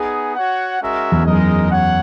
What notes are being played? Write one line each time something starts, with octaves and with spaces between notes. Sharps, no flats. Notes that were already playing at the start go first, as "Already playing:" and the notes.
Already playing: B3 D#4 G#4
F#4 C#5 F#5
G#3 C#4 F#4 A#4 E5
E2
F#2 G#3 D#4 A#4 D#5
C#5 F#5